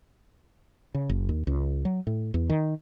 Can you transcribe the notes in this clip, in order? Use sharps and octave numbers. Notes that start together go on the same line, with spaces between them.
C#3
F#1
D#2
C#2
F#3
A2
E2
D#3